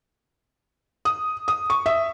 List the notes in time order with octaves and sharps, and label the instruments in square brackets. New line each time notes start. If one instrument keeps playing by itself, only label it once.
[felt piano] D#6
D#6
C#6
E5